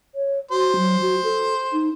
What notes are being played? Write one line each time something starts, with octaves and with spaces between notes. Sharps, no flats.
C#5
F#4 C5
F#3
F#4
A4
D#4